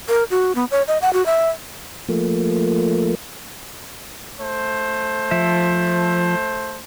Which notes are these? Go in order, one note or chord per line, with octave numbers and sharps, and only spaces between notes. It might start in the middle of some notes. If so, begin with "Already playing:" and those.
A#4
F#4
B3
C#5
D#5
F#5
F#4
E5
F3 A3 A#3
A3 C5
F3 E5